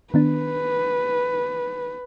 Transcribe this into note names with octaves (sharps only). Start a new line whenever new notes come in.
D#3 B3 D4 B4